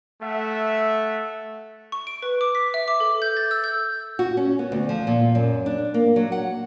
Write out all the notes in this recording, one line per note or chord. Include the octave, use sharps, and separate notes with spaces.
A3 E5 F#5
C#6
D7
B4
D6
B6
E5
D6
A4
G6
A6
E6
G6
F#4
C#4
B3
D2
F3
A#2
F#2
D4
A#3
F#3
F#5